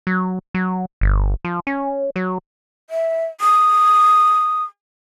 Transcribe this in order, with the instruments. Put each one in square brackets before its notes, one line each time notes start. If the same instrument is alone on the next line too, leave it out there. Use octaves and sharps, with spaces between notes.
[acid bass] F#3
F#3
G1
F3
C#4
F#3
[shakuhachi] E5
D#6